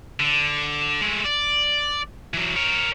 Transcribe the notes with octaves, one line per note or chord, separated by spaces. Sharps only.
D3
G#3 A3
D5
E3 F#3
A#4 C#5